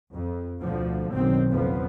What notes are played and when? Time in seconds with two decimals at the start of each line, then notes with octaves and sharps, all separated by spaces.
0.13 F2
0.61 D2 B2 D3 F3
1.12 F#1 B1 F#2 D#3 C4
1.50 F#1 F2 F3 B3